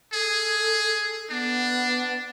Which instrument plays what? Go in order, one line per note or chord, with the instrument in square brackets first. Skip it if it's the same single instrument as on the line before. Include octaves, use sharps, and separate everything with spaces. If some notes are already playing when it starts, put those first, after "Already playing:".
[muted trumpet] G#4 [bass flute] A4
[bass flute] B3 [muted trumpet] D4